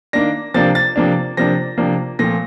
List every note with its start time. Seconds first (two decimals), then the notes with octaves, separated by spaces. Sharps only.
0.13 D#3 A#3 D4 A#6
0.54 C3 F3 A#3 D4 A6
0.75 A6
0.96 C3 F3 A#3 D4
1.37 C3 F3 A#3 D4 A#6
1.78 C3 F3 A#3 D4
2.19 A#2 F3 A3 C4 A#6